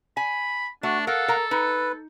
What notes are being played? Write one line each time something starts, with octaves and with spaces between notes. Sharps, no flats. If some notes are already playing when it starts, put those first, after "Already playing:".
G#5 B5
A3 D4 F#4
A4 A#4 F5 F#5
A#4 A#5
D#4 B4